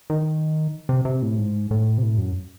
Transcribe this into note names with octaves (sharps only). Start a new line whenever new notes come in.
D#3
C3
C3
A2
G#2
A2
C3
A2
F#2